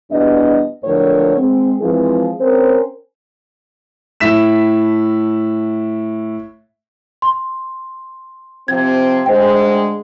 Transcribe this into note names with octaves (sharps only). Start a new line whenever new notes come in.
E2 B2 G3 D4 D#5
E2 A2 D3 F3 A#4 C#5
G#3 C4
E3 F3 G#3 C4 G#4
C4 C#4 A#4 C5
A2 E5 B6 E7
C6
C3 F3 C4 G#6
D2 G#3 C5 G5